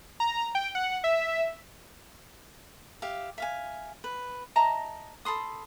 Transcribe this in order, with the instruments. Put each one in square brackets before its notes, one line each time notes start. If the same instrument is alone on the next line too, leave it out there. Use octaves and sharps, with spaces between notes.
[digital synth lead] A#5
G5
F#5
E5
[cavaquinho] G4 E5 F5
E5 F5 G#5
B4
D#5 E5 A5 A#5
A4 B5 C6 D#6